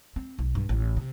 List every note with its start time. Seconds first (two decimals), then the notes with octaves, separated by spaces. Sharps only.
0.16 C4
0.39 B1
0.55 G2
0.69 A1
0.97 C3